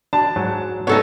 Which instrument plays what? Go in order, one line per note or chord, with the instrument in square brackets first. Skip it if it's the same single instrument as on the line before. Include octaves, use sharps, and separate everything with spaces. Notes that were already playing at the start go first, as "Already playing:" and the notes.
[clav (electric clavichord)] D4 [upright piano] A5
[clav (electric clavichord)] G#2 F#3
[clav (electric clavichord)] G#2 B3 [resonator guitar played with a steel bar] D#4 A4 C#5